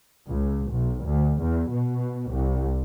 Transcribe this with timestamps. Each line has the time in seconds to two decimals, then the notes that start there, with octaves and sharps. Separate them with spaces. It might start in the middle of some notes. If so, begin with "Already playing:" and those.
0.27 C#2
0.70 B1
1.04 D2
1.41 E2
1.70 B2
2.30 C2